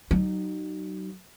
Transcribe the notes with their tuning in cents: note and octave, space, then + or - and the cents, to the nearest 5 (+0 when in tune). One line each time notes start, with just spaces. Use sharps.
F#3 +30 D#4 -25